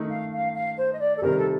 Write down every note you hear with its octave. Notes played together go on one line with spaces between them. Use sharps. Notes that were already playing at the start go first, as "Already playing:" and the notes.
Already playing: D#3 A3 D#4
F5
F5
F5
C5
D#5
D5
A4
C3 D#3 G3 A#4
A4